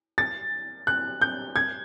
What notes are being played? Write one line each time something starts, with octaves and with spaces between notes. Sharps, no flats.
A6
F#6
G6
G#6